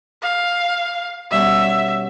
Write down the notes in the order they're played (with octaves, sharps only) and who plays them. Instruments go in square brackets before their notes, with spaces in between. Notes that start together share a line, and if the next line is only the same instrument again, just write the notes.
[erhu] F5
[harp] B2 G3 C#4 [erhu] E5